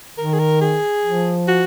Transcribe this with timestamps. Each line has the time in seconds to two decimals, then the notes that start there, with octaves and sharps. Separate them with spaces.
0.18 D#3 A#4
0.34 G#4
0.39 A#4
0.61 G#4
1.05 F3
1.48 F#4